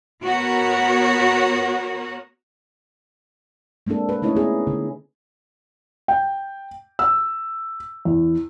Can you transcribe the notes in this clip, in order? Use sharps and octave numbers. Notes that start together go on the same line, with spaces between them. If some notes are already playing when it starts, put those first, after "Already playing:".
B3 F#4 A#4 C#5
G#3 A#3 C4 D4 A4
A4 B4
A3 C#4 D#4 E4 C#5 D#5
B3 G#4
D3
G5
E6
E2